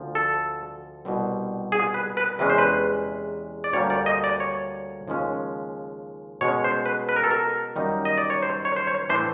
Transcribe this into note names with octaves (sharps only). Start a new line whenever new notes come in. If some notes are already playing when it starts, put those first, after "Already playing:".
Already playing: D2 D3 F3
A4
C2 B2 G3 C4
G#4
B4
B4
E2 C3 E3 G#3 C#4 B4
C5
B4
D5
D2 D3 G3 A#3 C#5
D5
D#5
D5
C#5
D#2 C#3 F3 G#3 C#4
B2 G#3 C#4 C#5
C5
B4
B4
A#4
A4
A#4
F#2 D#3 G3 A#3 D#4
D#5
D5
C#5
C5
C#5
C5
C#5
A2 E3 A3 D4 C5